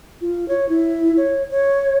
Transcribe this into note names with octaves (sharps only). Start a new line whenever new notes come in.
F4
C#5
E4
C#5
C#5